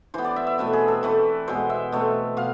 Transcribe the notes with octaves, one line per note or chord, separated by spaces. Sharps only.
E3 B3 C5
D5
E5
E5
B2 A3 C4 B4
G#4
A4
E3 A3 C4 B4
B2 G#3 B3 C5
E5
B2 A3 C4
B2 F5